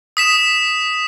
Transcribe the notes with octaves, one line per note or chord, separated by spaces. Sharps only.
D#6 B6 E7